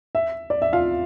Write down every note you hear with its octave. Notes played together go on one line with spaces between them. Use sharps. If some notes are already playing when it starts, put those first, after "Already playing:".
E5
D5
E5
F4 F5